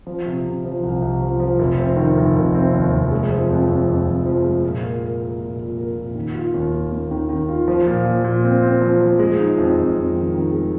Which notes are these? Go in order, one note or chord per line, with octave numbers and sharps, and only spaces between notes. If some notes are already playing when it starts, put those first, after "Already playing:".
F3
C3
C3
F3
C2
C2
F3
F3
F1
C4
D#3
F1
F1
C4
D#2
F1
G#3
F3
F2
F2
F2
F2
F3
G#3
A#2
A#4
A#4
A#4
A#2
A#2
A#4
A#2
D#3
F4
D#2
F4
D#2
D#3
D#3
F4
F3
A#2
F3
A#2
C4
C4
F3
F3
G#3
D#4
F2
F2
F2
D#3
D#3
G#3